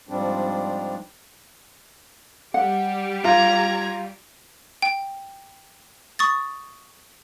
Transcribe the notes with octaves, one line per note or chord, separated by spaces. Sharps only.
G#2 F3 G3 C4 D4
G3 G4 F#5
F4 A#5 G#6
G5
C#6 D#6 A6